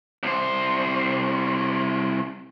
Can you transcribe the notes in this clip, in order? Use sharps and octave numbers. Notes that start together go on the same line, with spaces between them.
C2 C5